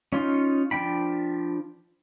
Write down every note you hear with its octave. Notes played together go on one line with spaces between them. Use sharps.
C#4 D#4 F4 C6
F3 D4 G5 B5